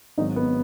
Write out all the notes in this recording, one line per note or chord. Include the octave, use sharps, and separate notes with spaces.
G#1 G#2 F#3 D#4
B3